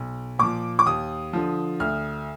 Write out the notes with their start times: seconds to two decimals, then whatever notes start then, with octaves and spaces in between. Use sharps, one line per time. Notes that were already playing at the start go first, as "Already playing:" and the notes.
Already playing: B1
0.39 A#2 F3 D6
0.79 D6
0.86 D#2 D#6
1.33 D3 F3
1.80 D2 F6